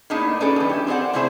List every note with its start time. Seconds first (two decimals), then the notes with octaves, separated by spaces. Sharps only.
0.10 A2 A#3 B3 D4 D#4 G#4
0.41 C#4 F#4 G#4 A4 B4 D5
0.56 G2 E3
0.70 E4 G4
0.87 C4 G#4 C#5 D5 F#5
1.13 C3 A3 C4 E4 G#4 C5